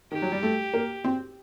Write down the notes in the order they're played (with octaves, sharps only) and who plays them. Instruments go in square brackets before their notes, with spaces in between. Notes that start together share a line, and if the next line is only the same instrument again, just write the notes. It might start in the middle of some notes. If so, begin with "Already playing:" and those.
[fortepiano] D#3 [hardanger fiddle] G4
[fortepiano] F#3
G3
A3
A#3
C4